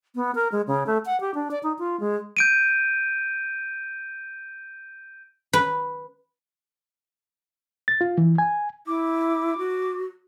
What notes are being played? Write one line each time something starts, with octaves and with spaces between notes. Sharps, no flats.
B3
A#4
G#3
C#3
A3
F#5
G4
D4
D5
D#4
F4
G#3
G6 D7 D#7
B4
A6
F4
E3
G#5
E4 D6
F#4